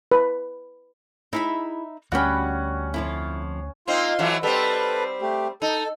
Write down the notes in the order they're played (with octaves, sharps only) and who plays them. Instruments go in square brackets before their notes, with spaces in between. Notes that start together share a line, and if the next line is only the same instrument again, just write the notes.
[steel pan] B4
[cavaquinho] D#4 E5 B5 [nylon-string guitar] E4 G#4
[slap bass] D2 [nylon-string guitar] G3 G5 [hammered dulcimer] C#4 F#5 [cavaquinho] F#4 B5
[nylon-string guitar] F2 F3 F4 [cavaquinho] E4
[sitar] A#3 C4 D#4 [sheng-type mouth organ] F4 C6
[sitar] E3 F#3 A3
[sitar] G3 C4 [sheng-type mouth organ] A4 B4
[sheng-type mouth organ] A3 G4
[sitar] D#4 [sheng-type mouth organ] A4